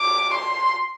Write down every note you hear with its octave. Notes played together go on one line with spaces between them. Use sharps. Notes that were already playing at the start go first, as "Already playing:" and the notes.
Already playing: D6
C6